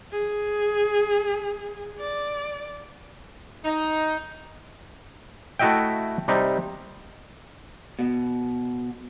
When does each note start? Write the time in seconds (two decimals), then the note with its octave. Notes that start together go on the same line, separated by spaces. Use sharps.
0.12 G#4
1.99 D5
3.64 D#4
5.59 A3 E4 F#4 D#5 E5 G5
6.28 C3 G3 D#4
7.99 B2